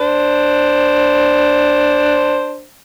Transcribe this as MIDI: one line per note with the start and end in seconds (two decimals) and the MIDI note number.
0.01 2.64 62
0.01 2.64 72